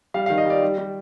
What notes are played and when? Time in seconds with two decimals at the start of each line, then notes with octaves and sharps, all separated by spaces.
0.14 G3 F5
0.26 D#3 F5
0.38 D#5
0.46 G3 D5
0.62 G3
0.78 G3